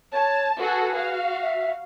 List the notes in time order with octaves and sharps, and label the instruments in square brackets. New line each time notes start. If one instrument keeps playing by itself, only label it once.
[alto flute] C#5 [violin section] A5
[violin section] F#4 G#4 A4 [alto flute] B4
[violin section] F#4 F5
[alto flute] E5